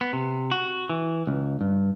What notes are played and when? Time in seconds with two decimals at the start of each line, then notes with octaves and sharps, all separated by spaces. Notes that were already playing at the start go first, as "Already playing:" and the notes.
0.01 B3
0.13 C3
0.51 F#4
0.89 E3
1.27 C#2
1.61 G2